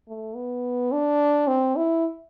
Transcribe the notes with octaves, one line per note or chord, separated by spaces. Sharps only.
A3
B3
D4
C4
E4